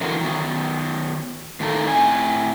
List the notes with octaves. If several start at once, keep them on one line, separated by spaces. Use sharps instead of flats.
D3 E3 F#3 B3 F#4 A#4
D#3 F#3 B3
A2 D#3 A#3 D#4 A4 A#5
A2 C4 G#5